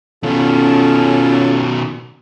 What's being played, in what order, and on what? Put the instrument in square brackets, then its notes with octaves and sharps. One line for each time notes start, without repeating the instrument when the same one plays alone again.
[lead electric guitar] B2 D#3 [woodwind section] C#4 C#5 [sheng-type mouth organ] F4 A4